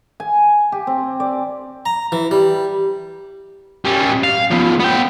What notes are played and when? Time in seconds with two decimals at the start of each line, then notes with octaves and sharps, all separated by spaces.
0.20 G#5
0.72 G4
0.87 C4
1.20 D5
1.86 A#5
2.12 E3
2.31 G3
3.85 G3 C#4
4.24 F5
4.51 F3 B3
4.80 B3 G5